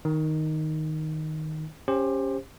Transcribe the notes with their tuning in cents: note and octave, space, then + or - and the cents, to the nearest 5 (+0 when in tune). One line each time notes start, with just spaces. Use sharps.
D#3 +0 D#4 +0
C#4 +0 G4 +20 C5 +15